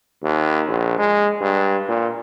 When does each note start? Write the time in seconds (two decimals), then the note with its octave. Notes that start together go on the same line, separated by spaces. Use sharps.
0.24 D#2
0.68 A#1
0.98 G#3
1.41 G2
1.88 A#2